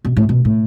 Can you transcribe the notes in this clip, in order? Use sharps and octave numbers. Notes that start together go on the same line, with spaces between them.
B2
A2
B2
A2